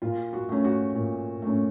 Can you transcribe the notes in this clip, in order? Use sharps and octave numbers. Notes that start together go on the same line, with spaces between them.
A#2 F4
F#4
A3 C#4
F#4
A#2
A3 C#4